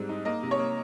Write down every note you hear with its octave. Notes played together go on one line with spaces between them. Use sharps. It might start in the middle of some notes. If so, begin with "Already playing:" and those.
Already playing: G#2 G3 C4
D#4
A#3 D#5
C3
C#5
A#3